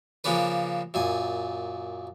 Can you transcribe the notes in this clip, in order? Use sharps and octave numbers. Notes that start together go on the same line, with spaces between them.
C#3 F3 A#3 C#4 D4 B4
F#2 A#2 G#5